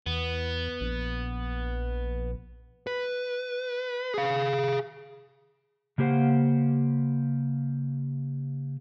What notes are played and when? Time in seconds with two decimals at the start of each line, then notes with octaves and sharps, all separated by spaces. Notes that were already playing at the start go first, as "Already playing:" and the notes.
0.06 E2 B3
0.81 A#1
2.87 B4
4.14 G#4 F5
5.98 C#3 A#3 G4 C5 F5 F#5